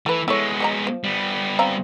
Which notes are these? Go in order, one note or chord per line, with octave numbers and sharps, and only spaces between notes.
E3 A3 B4
G#3 B3 E4 A4 C#5
F#3 D#5 A#5
F3
G3 B3
C4 F5 A#5